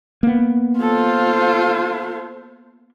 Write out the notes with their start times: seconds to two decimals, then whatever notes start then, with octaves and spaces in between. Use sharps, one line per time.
0.23 A#3 B3
0.81 F4 A4 C5